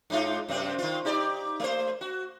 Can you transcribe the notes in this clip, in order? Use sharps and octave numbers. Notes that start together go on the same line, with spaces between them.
G#2 D#4 F4
F#2 C3 C4
D#3 F4
D#4 G4 D5
A3 C5
F#4